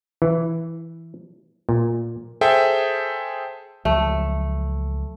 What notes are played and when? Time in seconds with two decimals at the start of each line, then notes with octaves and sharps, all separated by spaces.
0.22 E3
1.69 A#2
2.41 G#4 A4 C5 E5 G5
3.85 C#2 F3 F#3 A3